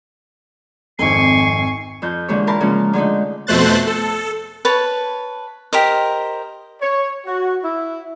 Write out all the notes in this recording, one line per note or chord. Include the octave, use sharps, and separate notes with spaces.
G#1 F2 G#5 C#6 C7
F2 C4 G6
D3 E3 G#3 A#3 G4 C#5
A#4 A5 B5 C6
C#3 F3 G#3 A#3 C#4
D3 G#3 A3 D#4
F2 B2 A3 C5 F#6 A6
A4
B4 C#5 A5
G4 A#4 C5 D#5
C#5
F#4
E4